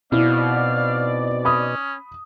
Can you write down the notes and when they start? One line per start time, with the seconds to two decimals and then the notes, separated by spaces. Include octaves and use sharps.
0.12 B2 C4 D#4 E4 D5 F5
1.45 C#4 B5 D#6